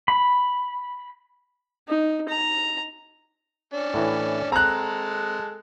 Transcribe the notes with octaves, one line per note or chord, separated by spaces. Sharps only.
B5
D#4
A#5
C#4 D4
A2 E3
G#3 C4 A4 A#5 F#6